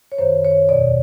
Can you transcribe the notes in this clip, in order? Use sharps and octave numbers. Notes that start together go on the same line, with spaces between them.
C#5
F#2 D#3 C5
C#5
E2 B2 D5